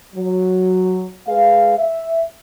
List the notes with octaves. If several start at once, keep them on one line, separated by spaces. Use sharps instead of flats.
F#3
G#3 G#4 B4 F5
E5